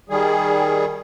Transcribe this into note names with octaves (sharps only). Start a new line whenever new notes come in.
D#3 G3 G#4